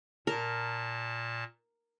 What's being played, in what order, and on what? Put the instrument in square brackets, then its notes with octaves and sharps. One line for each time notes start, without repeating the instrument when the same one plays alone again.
[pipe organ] A#2 A5 [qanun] A#4